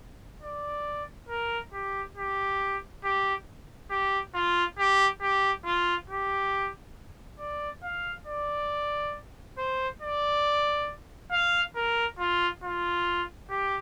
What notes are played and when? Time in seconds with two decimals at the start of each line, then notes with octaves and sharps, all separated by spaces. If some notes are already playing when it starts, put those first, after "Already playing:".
0.42 D5
1.29 A#4
1.73 G4
2.17 G4
3.04 G4
3.90 G4
4.34 F4
4.78 G4
5.21 G4
5.65 F4
6.09 G4
7.39 D5
7.83 F5
8.27 D5
9.58 C5
10.02 D5
11.31 F5
11.76 A#4
12.19 F4
12.63 F4
13.50 G4